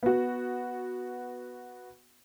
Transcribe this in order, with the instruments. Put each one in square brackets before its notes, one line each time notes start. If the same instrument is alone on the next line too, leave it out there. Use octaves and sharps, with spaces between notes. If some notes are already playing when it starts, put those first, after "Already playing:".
[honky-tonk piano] B3 F#4